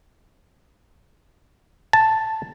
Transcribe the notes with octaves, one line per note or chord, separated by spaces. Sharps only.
A5